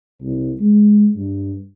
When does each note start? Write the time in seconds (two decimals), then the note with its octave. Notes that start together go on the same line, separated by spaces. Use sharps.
0.22 C2
0.60 G#3
1.16 G2